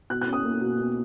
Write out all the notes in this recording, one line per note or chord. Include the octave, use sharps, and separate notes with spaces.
B2 F#6
F#6
C#4
D#6
A#3
B2
B2